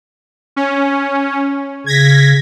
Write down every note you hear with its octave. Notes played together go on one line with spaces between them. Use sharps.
C#4
C#3 G#6 A#6 B6